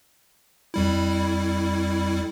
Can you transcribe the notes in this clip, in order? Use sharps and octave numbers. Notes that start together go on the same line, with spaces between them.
F2 G3 E4